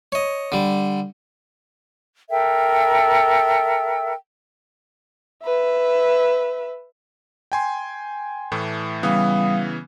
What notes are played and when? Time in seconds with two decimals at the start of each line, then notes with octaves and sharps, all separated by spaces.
0.12 C#5 D#5
0.52 D3 G3
2.30 A4 A#4 E5 G5
5.44 B4 E5
7.52 G5 G#5 C6
8.52 A2 E3 A3
9.03 C#3 E3 G3 B3 F5 D#6